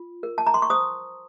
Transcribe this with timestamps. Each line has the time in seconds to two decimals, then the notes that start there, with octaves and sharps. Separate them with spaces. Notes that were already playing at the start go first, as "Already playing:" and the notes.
Already playing: F4
0.23 A#4
0.38 A5
0.47 A#5
0.54 C6
0.62 C#6
0.70 C5 D#6